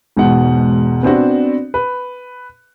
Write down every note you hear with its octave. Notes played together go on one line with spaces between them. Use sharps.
E1 G#2 B2 F#5
B3 C4 D4 F#4
B4